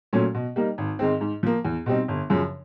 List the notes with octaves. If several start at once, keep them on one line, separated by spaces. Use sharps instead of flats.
A#2 F#3 A3 C#4
B2
G3 A#3 D#4
G#1
G#2 D#3 G#3 C4
G#2
F3 A#3
E2
B2 G3 C4 D#4
G1
F#2 C#3 F3